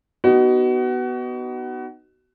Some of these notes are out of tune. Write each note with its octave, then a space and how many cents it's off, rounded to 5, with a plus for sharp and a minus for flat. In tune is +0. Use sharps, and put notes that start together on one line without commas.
B3 +5 D#4 -15 F#4 +25